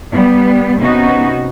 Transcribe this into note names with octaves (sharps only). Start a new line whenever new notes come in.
G3 B3
C3 B3 C#4 D#4 F#4